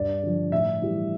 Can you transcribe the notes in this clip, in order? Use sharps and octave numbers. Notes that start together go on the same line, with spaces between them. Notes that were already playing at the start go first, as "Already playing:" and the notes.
Already playing: G2 D5
D3 F3
A2 E5
E3 G3